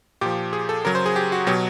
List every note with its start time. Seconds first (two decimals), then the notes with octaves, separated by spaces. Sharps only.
0.21 A#2 F3 G4
0.53 G#4
0.69 A4
0.85 C#3 F#3 A#4
0.95 C5
1.06 G#4
1.16 G4
1.32 F#4
1.47 B2 F#3 G4